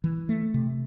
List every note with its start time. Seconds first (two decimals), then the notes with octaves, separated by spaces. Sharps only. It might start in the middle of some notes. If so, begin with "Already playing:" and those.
0.04 E3
0.29 A3
0.54 C3